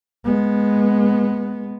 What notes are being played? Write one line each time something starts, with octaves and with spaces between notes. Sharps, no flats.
G#3 B3